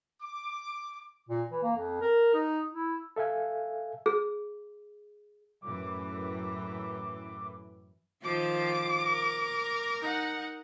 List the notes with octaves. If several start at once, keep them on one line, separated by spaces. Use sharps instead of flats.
D6
A#2
E3
A#3
F2
A#4
D#4
E4
A4 E5 F5 G#5
G#4
F#2 A2 E3 D6
D#3 F3 F4 D6
A#4
D#4 F#5